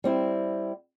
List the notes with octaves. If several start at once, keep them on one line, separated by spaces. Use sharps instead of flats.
G3 C4 E4